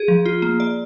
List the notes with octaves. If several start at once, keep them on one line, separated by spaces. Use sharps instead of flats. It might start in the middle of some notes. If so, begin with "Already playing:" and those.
Already playing: G#4
F3
F4
A#3
D5